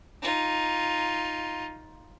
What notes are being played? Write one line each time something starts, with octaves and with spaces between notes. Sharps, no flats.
D#4 F4